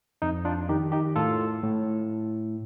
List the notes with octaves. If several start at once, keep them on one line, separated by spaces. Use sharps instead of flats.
F2 D#4
D4 F4
D#3 D#4 G4
D#4 G4
A2 F4 A4
A2